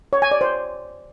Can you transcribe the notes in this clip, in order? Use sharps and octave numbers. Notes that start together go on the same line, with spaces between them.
C#5
G#5
D5
C5